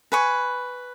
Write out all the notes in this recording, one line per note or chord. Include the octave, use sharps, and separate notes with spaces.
B4 G#5 C#6